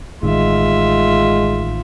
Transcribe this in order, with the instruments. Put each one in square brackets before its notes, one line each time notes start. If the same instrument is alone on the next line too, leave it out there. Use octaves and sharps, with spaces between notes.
[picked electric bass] A1 D#3 [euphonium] G#3 [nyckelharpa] F4 E5